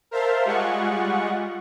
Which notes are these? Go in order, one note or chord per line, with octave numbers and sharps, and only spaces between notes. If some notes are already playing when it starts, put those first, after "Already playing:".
A#4 C5 E5 F5 A5 C6
G3 G#3 F4 G#4 F#5 C#6